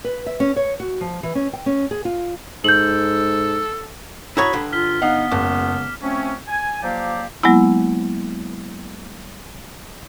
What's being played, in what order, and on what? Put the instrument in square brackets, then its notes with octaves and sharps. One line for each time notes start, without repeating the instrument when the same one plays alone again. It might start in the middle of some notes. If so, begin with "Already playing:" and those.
[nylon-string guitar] B4
E5
C#4
C#5
F#4
F3
E3
C#4
G5
C#4
G#4
F4
[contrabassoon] G#2 [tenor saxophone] A4 [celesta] G6 F#7
[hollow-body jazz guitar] E4 F#4 C#5 [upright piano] A#5 D#6 G#6 [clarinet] B5
[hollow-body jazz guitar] G2 D3
[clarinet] F4 [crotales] F6 B6 G7
[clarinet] B3 [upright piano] D#4 F5 F#5
[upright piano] F#1 [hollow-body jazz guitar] C#2 [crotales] D6
[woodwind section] F3 A3 C4 C#4
G#5
F3 F#3 A#3 G4 D5 F5
[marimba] F#3 G#3 A#3 B3 E4